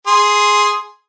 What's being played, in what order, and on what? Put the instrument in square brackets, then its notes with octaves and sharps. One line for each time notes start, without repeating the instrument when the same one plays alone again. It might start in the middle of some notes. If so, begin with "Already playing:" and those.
[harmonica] G#4 C6